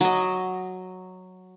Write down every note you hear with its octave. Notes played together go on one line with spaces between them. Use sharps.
F#3 D#5